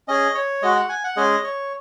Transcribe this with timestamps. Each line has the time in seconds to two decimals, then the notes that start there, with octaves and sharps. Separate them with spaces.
0.08 C#4 G#4 D#5
0.35 C#5
0.62 G#3 F#4 D#5
0.76 F#5
0.89 G#5
1.04 F#5
1.17 G#3 C#4 G#4 D#5
1.44 C#5